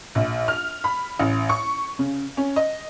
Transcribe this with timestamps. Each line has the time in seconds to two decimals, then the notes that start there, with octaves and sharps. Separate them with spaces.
0.15 A#1
0.48 F6
0.84 B5
1.19 A1
1.49 C#6
1.99 C#3
2.37 C#4
2.56 D#5